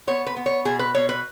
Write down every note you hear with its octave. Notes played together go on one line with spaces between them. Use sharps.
B3 C#5
B4
B3
C#5
B2 G#4
B4
B2 C#5
B4